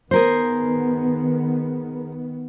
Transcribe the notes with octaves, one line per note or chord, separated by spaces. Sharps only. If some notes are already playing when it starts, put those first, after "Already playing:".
D#3 B3 G#4 A#4 C5